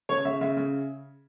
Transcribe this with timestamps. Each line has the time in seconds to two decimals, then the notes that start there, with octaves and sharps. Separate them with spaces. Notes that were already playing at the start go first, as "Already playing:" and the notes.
0.09 C#3 C#5
0.25 C#3 E5
0.41 C#3 E5
0.57 C#3